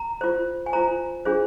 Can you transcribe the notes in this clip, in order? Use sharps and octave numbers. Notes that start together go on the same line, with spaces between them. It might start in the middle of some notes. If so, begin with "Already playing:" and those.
Already playing: A#5
F4 C5
G#5
F4 C5 A#5
D4 F4 G#4 C5